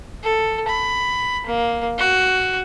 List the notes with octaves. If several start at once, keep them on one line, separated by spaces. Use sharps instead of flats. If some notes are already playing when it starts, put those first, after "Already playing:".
A4
B5
A#3
F#4